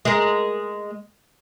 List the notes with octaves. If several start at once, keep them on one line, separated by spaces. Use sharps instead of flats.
G#3 A#4